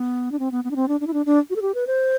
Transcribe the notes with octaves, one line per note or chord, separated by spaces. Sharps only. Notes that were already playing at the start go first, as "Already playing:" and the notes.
Already playing: B3
D4
C4
B3
B3
D4
C4
D4
D4
E4
D4
D4
F#4
A4
G4
B4
C5